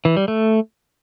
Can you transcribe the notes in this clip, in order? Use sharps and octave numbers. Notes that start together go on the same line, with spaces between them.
E3
G3
A3